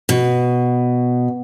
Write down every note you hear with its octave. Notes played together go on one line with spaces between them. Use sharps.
B2